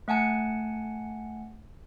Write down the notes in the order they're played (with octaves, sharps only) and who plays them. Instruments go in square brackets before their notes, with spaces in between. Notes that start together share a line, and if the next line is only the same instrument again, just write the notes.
[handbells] A3 F#5 G#5 A5 C#7